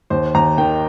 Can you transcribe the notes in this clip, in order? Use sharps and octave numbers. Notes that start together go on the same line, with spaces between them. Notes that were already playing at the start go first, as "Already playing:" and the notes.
D#2 C5
D#2 A#5
D#3 G5